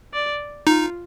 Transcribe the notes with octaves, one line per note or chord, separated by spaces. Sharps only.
D5
D#4 F4